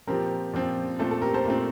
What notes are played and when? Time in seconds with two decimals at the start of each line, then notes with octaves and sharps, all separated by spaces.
0.07 A#2 F3 C4 G4 A#4
0.53 A#2 F3 C4
0.99 A#2 A3 C4 A4
1.11 A4
1.22 G4 A#4
1.34 A4 C5
1.45 A#2 A3 C4